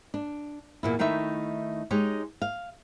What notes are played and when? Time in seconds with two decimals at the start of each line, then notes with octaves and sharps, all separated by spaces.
0.14 D4
0.83 E2 A#2 E4
0.99 D#3 A3 D#4 E4 E5
1.91 G#3 D#4 G4 C#5
2.42 F5